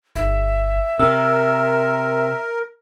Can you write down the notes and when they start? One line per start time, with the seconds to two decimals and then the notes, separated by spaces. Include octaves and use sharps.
0.16 G1 E5
0.99 C3 A#4 E6